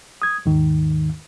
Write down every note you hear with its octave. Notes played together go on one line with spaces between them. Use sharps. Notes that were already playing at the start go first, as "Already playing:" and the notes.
D#6 G#6
D#2 G#2 D#3